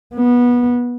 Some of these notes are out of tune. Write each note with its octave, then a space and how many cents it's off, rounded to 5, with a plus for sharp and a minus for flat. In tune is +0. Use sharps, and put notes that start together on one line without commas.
B3 -20